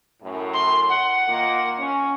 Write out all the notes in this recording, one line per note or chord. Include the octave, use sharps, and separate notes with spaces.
F#2 A2
C6
F#5
D#3 A#3 F4
C#4